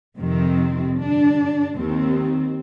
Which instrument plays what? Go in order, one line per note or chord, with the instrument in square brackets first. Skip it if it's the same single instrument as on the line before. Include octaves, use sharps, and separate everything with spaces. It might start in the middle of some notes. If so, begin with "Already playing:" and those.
[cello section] F2 C3 D#3 C4
G2 D3 D4
D#2 D#3 C4